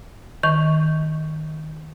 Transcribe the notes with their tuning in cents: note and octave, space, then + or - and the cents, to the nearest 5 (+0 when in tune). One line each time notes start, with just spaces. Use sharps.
D#3 +0 C#6 +0